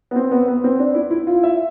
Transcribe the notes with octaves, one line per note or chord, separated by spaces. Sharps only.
B3
C4
B3
B3
C4
D4
E4
E4
F4
E5